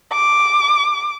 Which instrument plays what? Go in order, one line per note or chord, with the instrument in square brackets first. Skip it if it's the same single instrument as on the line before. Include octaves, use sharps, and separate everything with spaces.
[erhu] D6